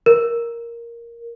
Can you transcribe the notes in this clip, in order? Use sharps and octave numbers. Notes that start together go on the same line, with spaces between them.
A#4